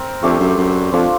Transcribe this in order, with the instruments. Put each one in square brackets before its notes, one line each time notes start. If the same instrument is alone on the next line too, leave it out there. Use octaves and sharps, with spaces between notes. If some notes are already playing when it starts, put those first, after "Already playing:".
Already playing: [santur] C4 A#4
[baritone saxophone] F2 [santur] A3 D4 G4
[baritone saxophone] F#2
F#2
[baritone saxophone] F2 [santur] D4 F4 A4 C5